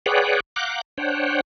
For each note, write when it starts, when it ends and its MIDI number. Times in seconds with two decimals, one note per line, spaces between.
0.06 0.40 68
0.06 0.40 71
0.06 0.40 73
0.06 0.40 74
0.06 0.40 78
0.06 0.40 79
0.56 0.81 77
0.56 0.81 78
0.56 0.81 82
0.56 0.81 86
0.56 0.81 90
0.56 0.81 91
0.98 1.41 62
0.98 1.41 72
0.98 1.41 73
0.98 1.41 78
0.98 1.41 79